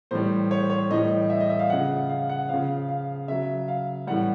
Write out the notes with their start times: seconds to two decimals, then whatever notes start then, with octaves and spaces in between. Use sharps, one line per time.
0.11 A2 E3 G3 C5
0.51 C#5
0.60 C5
0.70 C#5
0.90 A2 E3 G3 D#5
1.30 E5
1.40 D#5
1.50 E5
1.59 F5
1.70 C#3 F3 F#5
2.09 F5
2.29 F#5
2.49 C#3 F3 F5
2.89 F5
3.28 C#3 F#3 E5
3.68 F5
4.07 A2 E3 G3 F#5